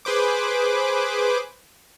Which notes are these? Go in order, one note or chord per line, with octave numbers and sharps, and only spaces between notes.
G#4 B4 C5 D6